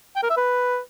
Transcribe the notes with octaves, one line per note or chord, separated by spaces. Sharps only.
G5
A#4
E5
B4